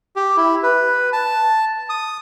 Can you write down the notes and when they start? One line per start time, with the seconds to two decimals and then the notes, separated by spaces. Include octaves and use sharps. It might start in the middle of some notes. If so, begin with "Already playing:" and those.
0.16 G4
0.37 E4
0.63 B4
1.13 A5
1.89 D#6